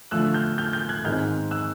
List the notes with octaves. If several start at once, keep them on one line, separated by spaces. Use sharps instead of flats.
D3 F3 A3 E6 F#6
F6 G6
F6 G6
F6 G6
F#6 G#6
G#2 D#3 G#3 C4 F6 G6
E6 F#6